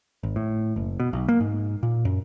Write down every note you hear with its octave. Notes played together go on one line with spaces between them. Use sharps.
G#1
A2
F#1
B2
B1
A#3
G#2
A#2
F#2